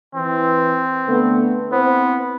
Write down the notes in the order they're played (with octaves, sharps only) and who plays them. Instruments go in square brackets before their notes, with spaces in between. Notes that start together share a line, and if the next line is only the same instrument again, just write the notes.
[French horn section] E3 [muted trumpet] C4
[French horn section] D3 A3 B3
[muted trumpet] B3 [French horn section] C4 E4 C5